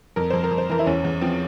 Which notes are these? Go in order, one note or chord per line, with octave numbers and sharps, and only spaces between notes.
F2 A#4
F2 C5
A#4
F2
C5
E3 A#4
E4
E2 C#4
E2
F3 C4